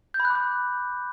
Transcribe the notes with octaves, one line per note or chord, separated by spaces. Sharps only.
G6
B5
F#6
D6
F#6